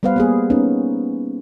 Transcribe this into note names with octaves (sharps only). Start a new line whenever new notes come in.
G3 B3 B4 C5 F5
A#3 B3 G#4
B3 C#4 D#4